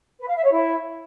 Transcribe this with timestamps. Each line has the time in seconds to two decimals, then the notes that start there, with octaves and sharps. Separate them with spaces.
0.19 B4
0.27 F5
0.36 E5
0.44 C#5
0.52 E4